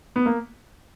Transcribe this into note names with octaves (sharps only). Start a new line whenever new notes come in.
B3
A#3